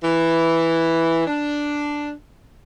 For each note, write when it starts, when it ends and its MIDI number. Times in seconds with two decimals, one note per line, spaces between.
0.03 1.25 52
1.27 2.12 62